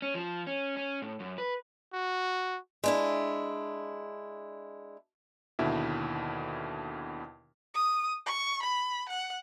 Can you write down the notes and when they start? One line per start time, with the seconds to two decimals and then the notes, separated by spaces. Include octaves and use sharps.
0.02 C#4
0.14 F3
0.47 C#4
0.77 C#4
1.02 A2
1.20 F#2
1.38 B4
1.94 F#4
2.84 G#3 D4 E4
5.59 D#2 B2 D3 E4 E5
7.74 D#6
8.26 C#6
8.62 B5
9.09 F#5